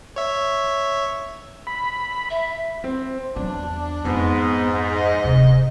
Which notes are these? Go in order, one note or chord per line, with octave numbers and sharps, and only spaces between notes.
C#5 E5
B5
E5
C4
E2 F#3 D4
F2 G#2 B3
D#5
D1 C3